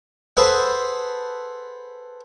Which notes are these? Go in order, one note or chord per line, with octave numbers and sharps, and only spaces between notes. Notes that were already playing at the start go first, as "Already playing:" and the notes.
G#4 A4 B4 C5 F#5